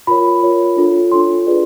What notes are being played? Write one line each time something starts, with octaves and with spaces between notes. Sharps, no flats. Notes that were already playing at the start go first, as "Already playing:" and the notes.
F4 A#4 C#5 B5
F4 A#4 C#5
D4 F4 A4 C#5
D4 F4 A4 C#5 C6
F4 G#4 B4 D5